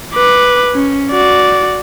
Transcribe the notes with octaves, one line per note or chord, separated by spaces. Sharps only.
B4 D6
C#4
F#4 D5